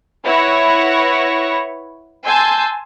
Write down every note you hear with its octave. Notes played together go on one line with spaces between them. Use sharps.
E4 B4 C#5 F#5 C#6 A#6
G#5 A5 C6 E6 G6